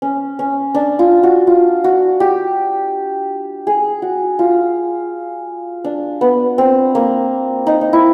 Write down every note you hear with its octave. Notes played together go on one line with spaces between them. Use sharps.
C#4
C#4
D4
F4
F#4
F4
F#4
G4
G#4
F#4
F4
D4
B3
C4
A#3
D#4
D#4
E4